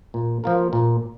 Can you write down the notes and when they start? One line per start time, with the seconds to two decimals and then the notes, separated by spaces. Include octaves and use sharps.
0.14 A#2
0.44 F3 A#3 F4 A#4
0.73 A#2